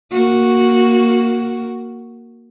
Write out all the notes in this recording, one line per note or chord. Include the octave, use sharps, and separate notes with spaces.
A#3 F#4